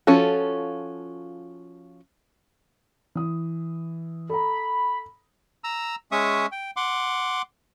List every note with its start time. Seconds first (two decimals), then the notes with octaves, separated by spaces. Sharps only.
0.07 F3 C#4 F4 F#4 A4
3.15 E3 D#6
4.30 A4 A#5 B5
5.64 A#5 E6
6.12 G#3 C#4 E5 C#6 D#6
6.52 G5
6.76 F#5 C6 D6